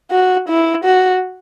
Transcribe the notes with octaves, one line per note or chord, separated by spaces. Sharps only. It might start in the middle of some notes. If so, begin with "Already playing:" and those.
F#4
E4
F#4